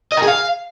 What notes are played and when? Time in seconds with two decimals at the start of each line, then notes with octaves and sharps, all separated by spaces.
0.12 D#5
0.17 A#4
0.22 G#4
0.28 F5